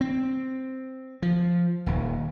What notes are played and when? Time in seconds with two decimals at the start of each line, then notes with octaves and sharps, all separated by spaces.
0.01 C4
1.22 F3
1.86 D#1 D#2